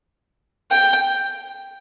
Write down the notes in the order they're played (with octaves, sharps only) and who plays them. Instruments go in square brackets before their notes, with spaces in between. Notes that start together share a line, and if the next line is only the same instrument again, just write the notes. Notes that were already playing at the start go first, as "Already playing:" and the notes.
[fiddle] G5